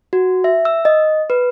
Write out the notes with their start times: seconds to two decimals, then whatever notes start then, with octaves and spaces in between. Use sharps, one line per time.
0.13 F#4
0.44 E5
0.65 E6
0.85 D#5
1.30 B4